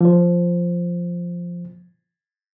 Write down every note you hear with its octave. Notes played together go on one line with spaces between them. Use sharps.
F3 C5